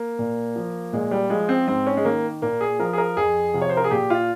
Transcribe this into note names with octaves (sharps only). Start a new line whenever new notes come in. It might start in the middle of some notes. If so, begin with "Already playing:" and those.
Already playing: A#3
A#2
F3
A#2 G#3
G3
F3 G#3
C4
G#2 C4
C#4
G#3
D#3 A#3
A#2 A#3
G#4
F3 A#4
G#4
A#4
F2 G#4
C3 F3
C#5
C5
A#4
G#4
A#2 G4
F4